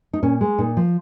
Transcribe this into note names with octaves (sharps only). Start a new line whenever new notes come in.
D#4
A#2 C#4
G#3
A#2 D#4
F3